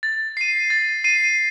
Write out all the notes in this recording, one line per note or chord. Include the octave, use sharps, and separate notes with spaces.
A6
C7 D#7
A6
C7 D#7